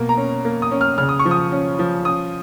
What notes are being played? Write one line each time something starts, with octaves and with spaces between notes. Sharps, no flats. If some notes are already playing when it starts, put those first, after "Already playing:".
Already playing: B2 A#3
A#5
C#4
A#3
D#6
C#4
F6
C#3 F6
D#6
C#6
F3
D#6
C#4
F3
C#4 D#6